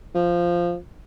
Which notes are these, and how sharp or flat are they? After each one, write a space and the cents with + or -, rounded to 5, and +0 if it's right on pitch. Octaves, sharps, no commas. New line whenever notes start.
F3 -5